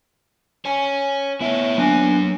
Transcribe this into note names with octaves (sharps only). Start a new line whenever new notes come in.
C#5 G#5
B3 E4 C#5 E5
F#3 A#3 B3 D4 G#5